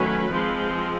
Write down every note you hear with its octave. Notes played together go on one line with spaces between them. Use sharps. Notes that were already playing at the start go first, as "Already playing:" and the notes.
Already playing: D#3 F#3 A3 C#4 B4
F3 G#3 C4